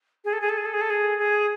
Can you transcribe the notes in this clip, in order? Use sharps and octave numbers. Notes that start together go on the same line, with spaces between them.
G#4
A4
G#4
A4
G#4
A4
G#4
A4
G#4
G#4